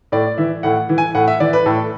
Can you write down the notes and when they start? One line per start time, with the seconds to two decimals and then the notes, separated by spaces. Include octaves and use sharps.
0.12 A2 D5
0.38 E3 E5
0.63 A2 F#5
0.89 E3
0.98 G#5
1.15 A2 F#5
1.28 E5
1.40 E3 D5
1.53 B4
1.66 A2 A4